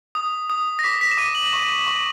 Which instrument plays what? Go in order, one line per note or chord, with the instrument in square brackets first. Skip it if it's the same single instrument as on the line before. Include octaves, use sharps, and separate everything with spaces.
[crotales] D#6
D#6
A#6
D6 B6
B6
E7
D6 D#7
F#7
C#6 E7
C#6